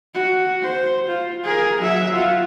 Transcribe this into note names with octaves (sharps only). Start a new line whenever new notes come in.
F#4
C5
F4
G#4 A#4
F#3 E5
F4 F#4